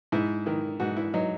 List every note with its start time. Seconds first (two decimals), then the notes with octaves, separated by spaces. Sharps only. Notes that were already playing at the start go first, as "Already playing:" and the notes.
0.12 G#2 E4
0.46 D#3 E4
0.80 G#2 F#4
0.97 E4
1.14 F#3 D#4